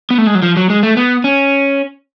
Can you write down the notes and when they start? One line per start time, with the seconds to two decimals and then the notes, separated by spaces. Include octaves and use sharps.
0.10 B3
0.18 A3
0.27 G#3
0.35 F#3
0.42 F3
0.57 F#3
0.70 G#3
0.83 A3
0.97 B3
1.24 C#4